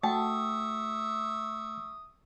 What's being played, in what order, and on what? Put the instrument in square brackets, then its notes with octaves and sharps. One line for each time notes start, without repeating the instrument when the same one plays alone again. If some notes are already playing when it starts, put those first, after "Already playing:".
[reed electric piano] A3 [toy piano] F#4 F#5 G5 [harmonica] E5 C#6 D#6 [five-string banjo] A5